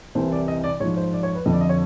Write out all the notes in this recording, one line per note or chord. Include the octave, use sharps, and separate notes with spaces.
C2 C3 E3 C5
D5
D#5
D5
G#2 F3 C#5
C5
D5
C#5
B4
F2 D3 F3 D#5
D5
D#5
C#5